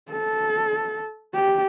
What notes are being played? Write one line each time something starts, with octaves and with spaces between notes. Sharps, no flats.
A4
G4